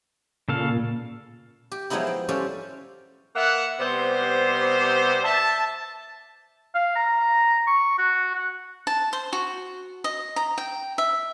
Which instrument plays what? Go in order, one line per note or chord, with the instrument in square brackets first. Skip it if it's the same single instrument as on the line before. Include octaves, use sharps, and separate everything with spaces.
[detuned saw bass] A#2 [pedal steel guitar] C#3 A4 F5
[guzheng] G4
F3 F#3 G#3 B3 D#4 E4
G5
G3 C#4 G4 A4 C5 F5
[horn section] A#3 B4 E5 F#5
C3 G3 B3 C5
E5 A5
[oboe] F5
A#5
C#6
F#4
F#5
[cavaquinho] A5
C5
F#4
D#5
A#5
G5
E5